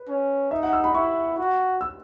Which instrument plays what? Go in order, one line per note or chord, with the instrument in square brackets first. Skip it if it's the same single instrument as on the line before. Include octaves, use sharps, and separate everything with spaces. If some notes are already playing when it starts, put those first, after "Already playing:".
Already playing: [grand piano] B4
[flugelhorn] C#4
[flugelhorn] D#4 [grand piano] E5
[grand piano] F#5
E6
B5
[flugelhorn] E4 [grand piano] C#6
[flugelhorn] F#4
[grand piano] E6